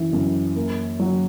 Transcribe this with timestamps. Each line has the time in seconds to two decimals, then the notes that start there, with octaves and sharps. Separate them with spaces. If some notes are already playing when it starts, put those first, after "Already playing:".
Already playing: F#2 E3
0.13 F#2
0.56 A#3
0.99 F#3